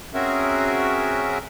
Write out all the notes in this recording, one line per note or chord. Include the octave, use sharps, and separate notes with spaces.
C4 C#4 F#4 G#4 A#4 E5